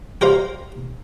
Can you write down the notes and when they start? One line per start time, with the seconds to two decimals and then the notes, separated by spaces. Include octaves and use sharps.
0.21 G4 A#4 C5 F5